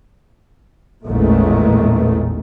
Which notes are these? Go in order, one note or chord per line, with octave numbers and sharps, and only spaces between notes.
A1 E2 A#2 D#3 G#3 A3